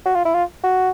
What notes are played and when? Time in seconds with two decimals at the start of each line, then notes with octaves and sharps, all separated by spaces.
0.06 F#4
0.15 F4
0.25 E4
0.35 F4
0.64 F#4